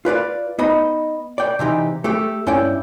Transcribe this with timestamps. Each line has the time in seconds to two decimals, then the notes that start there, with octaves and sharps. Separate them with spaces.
0.05 F4 B4 D5 F5
0.59 B3 D#4 D#5 B5
1.38 D5 G5
1.59 C3 E3 D#4 G4
2.04 A3 G4 A4
2.47 G2 C#4 E4 D5 G5